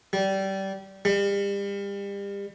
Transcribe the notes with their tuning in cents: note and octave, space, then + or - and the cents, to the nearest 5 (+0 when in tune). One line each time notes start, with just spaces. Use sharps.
G3 -20
G3 +35